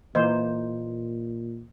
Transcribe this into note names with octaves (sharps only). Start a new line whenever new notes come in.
A#2 E3 A#3 C5 D#5